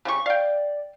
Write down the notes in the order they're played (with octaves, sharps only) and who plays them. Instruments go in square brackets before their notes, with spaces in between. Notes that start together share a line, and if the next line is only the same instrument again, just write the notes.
[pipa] C#3 G3 C#6
[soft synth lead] D5 [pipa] F5 G5